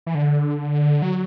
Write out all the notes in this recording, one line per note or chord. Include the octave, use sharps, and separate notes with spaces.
E3
D3
F#3